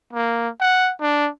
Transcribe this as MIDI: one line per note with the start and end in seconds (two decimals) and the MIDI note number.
0.13 0.49 58
0.61 0.92 78
1.01 1.29 62